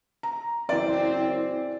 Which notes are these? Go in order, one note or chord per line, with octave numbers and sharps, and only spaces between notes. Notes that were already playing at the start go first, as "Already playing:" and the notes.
A#5
F#1 E3 C4 D5